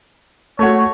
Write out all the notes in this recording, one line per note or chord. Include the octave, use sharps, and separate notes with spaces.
A3 F#4 C#5